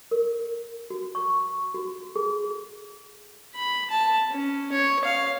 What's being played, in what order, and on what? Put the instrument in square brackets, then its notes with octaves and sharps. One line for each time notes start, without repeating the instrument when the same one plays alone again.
[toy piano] A#4
F#4
C#6
F#4
G#4
[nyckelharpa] B5
A5
C#4
C#5
F5